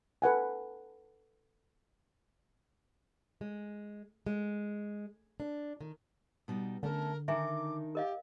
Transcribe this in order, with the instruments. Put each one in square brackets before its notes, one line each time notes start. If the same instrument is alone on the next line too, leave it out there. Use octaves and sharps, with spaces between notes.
[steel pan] A4 B4 F#5 G#5
[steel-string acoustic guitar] G#3
G#3
D4
D#3
B2 G3 D#4
[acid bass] D3 [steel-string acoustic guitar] A3 C#4 A4 [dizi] A#4
[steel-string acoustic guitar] D#3 D4 D#4 [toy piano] E5 G#5 A#5 [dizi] D6
[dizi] G4 [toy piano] A#4 D#5 F5